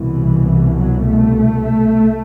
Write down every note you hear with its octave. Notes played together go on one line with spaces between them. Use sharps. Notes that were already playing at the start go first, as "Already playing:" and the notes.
Already playing: C2 B2 E3
F#3
A3